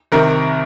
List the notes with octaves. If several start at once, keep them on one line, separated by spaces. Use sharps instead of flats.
C2 C3 D#3 A#4